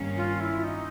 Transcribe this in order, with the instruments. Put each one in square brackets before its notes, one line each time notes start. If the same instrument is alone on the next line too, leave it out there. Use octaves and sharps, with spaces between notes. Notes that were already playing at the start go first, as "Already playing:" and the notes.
Already playing: [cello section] G2 D#3 G3 A#3 C#4
[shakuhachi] F4
E4
D#4